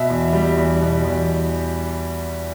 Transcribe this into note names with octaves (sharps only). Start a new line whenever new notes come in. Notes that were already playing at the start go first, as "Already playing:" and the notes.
Already playing: B2 E5
E2
G3
E2
B2
E2